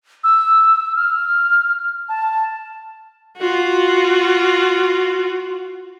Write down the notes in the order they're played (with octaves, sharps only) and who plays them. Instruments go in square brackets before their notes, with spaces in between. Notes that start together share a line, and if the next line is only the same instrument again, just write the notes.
[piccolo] E6
F6
A5
[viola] F4 F#4